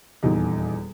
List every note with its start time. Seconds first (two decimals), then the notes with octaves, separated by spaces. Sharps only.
0.23 D#1 E2 D#4